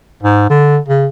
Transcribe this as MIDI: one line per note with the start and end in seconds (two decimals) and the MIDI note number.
0.23 0.46 44
0.50 0.78 50
0.88 1.07 49